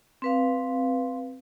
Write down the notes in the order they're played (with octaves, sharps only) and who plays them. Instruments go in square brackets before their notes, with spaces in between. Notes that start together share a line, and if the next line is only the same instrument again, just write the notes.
[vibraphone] C4 B4 F5